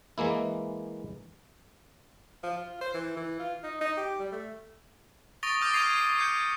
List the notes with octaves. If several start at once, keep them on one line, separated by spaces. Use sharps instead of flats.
E3 G#3 A#3 E4
F3
F4
C5
E3
E3
F4
D#4
D#4
G4
G3
A3
C#6 D#6 A6 A#6 D7 G7
D6 D#6 F6 G6 A#6 D7
C#6 D#6 G#6 C7 D#7
C7
G6 G#6 C7 C#7 D#7